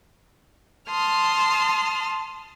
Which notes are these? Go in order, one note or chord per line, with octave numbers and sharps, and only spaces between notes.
A5 C6 D#6 F6